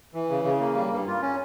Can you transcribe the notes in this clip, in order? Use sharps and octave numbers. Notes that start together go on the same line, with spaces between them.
E3
C#3
C#3
A#3
G3
G2
F4
C#4